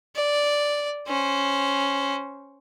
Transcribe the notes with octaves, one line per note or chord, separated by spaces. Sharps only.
D5
C#4 C5